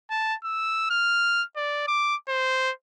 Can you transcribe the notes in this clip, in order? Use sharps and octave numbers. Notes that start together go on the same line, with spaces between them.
A5
E6
F6
D5
D6
C5